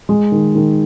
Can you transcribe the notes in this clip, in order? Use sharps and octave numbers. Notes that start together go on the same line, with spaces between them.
G#3
D#3
D#3